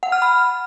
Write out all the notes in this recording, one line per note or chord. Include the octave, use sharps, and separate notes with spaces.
F#5
F6
B5